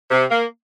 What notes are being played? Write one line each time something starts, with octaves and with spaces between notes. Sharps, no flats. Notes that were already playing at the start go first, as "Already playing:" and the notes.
C3
A#3